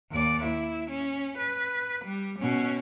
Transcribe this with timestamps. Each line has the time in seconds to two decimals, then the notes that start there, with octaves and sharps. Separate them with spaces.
0.11 D#2 D5
0.44 E4
0.91 C#4
1.38 B4
2.05 G3
2.39 B2 C#4